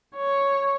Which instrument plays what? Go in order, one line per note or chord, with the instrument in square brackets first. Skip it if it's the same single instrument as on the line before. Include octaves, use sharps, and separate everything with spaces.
[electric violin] C#5